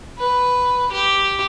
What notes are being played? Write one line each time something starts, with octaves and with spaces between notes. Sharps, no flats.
B4
G4